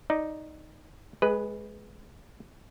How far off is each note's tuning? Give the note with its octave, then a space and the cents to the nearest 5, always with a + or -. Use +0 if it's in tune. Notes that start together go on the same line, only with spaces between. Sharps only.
D#4 +0 D5 +10
G#3 +15 G#4 -25 B4 +0